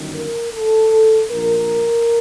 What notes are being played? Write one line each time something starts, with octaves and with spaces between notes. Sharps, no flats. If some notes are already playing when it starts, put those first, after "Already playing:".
Already playing: G1 F#2 D#3
A#4
A4
A#1 A#2 A#4